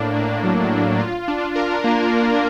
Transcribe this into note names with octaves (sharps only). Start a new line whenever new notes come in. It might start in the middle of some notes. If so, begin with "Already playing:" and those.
Already playing: A2 A#3 D4
A#3
F#3
F#3
F4
D4
A#4
A#3